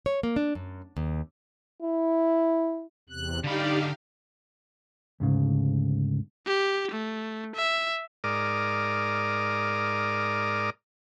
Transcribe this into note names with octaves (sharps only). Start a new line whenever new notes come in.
C#5
A#3
D4
F#2
D#2
E4
E2 C3 F#6
D3 D#4 G4 D5 F5 B5
D2 G#2 C#3
G4
A3
E5
G#2 A#4 D5 D6 D#6 F6